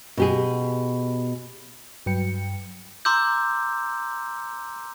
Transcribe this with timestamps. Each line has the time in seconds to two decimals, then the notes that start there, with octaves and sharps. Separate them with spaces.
0.17 B2 G4 G#4
2.06 G2 F#3 B4 G5 C#7
3.05 A#5 C6 D6 E6 G6